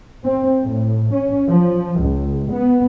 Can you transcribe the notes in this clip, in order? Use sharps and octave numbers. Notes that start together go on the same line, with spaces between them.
C4
A2
C#4
F3
C#2
B3